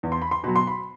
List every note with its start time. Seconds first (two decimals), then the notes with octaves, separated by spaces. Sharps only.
0.03 E2
0.12 C6
0.22 B5
0.31 C6
0.43 B2 F#3 B5
0.56 C6
0.67 B5